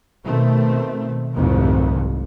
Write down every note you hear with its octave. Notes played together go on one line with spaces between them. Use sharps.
B2 D#3 A3 C4
F1 C2 F2 G#2 C3 D#3